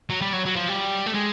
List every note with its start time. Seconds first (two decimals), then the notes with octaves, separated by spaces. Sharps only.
0.10 F#3
0.21 G3
0.33 F#3
0.46 F#3
0.56 F3
0.69 G3
1.06 A3
1.15 G#3